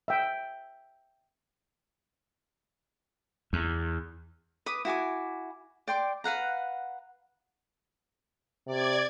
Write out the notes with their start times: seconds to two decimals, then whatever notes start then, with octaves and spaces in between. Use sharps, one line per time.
0.08 E5 G5
3.53 E2
4.66 B4 D6 D#6
4.85 E4 F#4 G#5 D6
5.88 D5 G5 C6 D6
6.24 B4 F5 F#5 A#5
8.67 C3 D5 G#6